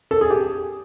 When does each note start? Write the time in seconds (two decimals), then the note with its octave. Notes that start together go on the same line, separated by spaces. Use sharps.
0.11 A4
0.21 G#4
0.30 G4